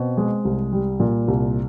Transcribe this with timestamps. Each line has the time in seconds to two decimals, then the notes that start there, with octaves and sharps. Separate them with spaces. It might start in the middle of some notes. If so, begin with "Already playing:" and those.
Already playing: B2 C4
0.17 G#3
0.45 C2
0.72 G3
1.00 A#2
1.28 C2